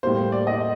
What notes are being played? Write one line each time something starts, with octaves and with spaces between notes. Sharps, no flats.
A2 G3 A#3 C5
D5
D#5